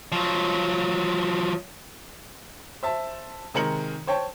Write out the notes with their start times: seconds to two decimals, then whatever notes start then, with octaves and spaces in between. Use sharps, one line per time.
0.12 F3 F#3
2.83 C5 E5 A5
3.54 C3 D#3 G#3 A#4 C#7 F#7
4.07 C5 C#5 G5 A5